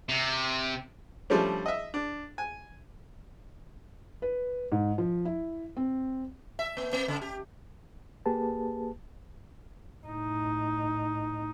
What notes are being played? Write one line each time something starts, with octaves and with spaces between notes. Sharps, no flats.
C3
F3 G3 A3 C#4 D4
D#5 E5
D4
G#5
B4
G#2
F3
E4
C4
E5
A#3
A#3
C#3
G4
A#3 G4 G#4 B4 A5
A2 D#4